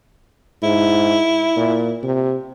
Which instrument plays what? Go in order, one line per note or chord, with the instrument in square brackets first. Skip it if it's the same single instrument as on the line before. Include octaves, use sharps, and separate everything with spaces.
[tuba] G#2 [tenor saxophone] E4
[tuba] A#2
C3